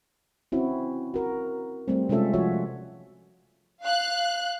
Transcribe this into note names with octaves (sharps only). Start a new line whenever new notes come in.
C4 C#4 E4 F#4
F#4 A#4
G3 A3 C4
C3 G#3 C#4 F4 A4 E5
F3 F4 F#4 C#5 E5
F5 F#6